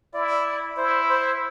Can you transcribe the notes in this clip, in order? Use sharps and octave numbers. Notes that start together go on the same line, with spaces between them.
E4 D5
E4 C5
C5